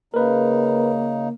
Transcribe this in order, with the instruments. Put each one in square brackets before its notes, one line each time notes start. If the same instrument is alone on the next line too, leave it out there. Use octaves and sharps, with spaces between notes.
[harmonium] C#3 D#4 [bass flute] A#3 [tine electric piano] A#4 B4